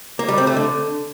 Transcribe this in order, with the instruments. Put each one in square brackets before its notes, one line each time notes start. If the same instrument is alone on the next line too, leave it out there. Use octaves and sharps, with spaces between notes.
[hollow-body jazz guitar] A#3
G3
C4
A3
D3